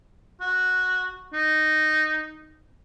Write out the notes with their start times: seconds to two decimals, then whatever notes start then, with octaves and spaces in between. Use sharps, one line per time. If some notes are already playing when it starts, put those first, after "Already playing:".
0.41 F#4
1.33 D#4